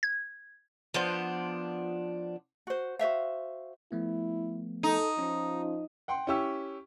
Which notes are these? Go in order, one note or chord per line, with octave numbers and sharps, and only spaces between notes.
G#6
F3 B3 D4 C5
F#4 C5
F#4 C5 E5 F5
F3 A3 B3 E4
D#4 A4
F3 C#4 F4
F#5 G5 C6
C#4 E4 G4 C#6 E6